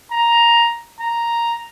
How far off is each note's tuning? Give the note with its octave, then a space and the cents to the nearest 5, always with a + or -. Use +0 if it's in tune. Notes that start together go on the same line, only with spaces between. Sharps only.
A#5 +5
A#5 +0